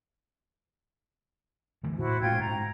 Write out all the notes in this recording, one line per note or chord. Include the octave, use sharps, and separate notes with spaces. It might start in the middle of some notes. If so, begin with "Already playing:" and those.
D3 E3 A3
A2 E4 F#4 C5
A2 G#3 C#4 F4 G5 G#6
G#2 A#5